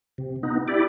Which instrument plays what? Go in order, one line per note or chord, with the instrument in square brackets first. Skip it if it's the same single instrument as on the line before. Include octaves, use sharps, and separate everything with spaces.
[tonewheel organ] C3
B3 D#4
E4 G4 D5